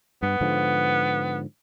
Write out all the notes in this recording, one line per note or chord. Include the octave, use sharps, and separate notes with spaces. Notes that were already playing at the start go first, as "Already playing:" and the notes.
G2 B3
G#2 D3 F3